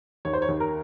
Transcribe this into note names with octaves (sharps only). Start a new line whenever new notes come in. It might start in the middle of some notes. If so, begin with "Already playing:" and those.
D#2 C#5
C5
C#5
D#2
A#4